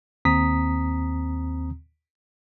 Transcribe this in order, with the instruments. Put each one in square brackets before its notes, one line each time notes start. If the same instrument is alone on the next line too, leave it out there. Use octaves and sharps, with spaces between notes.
[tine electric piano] D#2 C4 A#5 D#6 B6